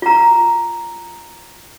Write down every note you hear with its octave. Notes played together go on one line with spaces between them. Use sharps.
F4 A#5